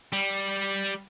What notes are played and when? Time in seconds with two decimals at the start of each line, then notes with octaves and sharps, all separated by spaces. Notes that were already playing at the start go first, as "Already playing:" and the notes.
0.13 G3